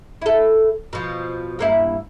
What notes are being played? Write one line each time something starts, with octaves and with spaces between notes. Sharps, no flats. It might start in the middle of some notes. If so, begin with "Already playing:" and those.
E4 A4
B2 F3
G2 A#3 E4